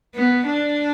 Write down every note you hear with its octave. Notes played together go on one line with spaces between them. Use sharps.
B3
D4